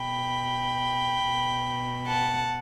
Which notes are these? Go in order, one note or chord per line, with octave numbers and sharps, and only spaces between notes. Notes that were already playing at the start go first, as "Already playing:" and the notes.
Already playing: B2 G5 B5
B2
F#5 A5